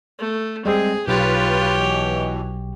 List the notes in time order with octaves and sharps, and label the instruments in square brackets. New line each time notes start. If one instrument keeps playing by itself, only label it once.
[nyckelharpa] A3
[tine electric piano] G3 G#3 C4 [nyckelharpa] G#4
[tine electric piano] B1 [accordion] F4 B4 [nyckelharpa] G4 C#5
[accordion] B2 E3